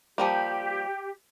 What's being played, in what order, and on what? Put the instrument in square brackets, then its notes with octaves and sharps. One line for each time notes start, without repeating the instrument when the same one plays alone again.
[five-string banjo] F3 G3 A#3 [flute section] G4